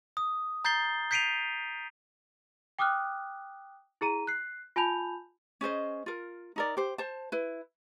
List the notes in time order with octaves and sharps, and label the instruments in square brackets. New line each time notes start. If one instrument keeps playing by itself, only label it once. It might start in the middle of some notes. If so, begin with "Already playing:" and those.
[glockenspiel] D#6
A#5 G6 A6 C7 G7
G6 B6 C7 D7 D#7 F7
[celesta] G5 D6 D#6 F6 F#6
E4 G#4 A#5 D#7
F#6 C7
F4 G#5 A5 B5 G6 F7
[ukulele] C#4 G#4 C5 D#5
F4 A#4
D#4 A#4 D5
G4 C5
C5 A5
E4 B4